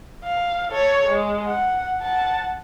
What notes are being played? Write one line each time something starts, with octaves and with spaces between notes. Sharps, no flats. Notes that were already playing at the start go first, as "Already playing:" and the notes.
F5
A4 C#5
G#3
F#5
F#5 A5